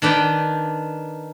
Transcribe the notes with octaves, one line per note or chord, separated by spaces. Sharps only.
D#3 D4 B4 G5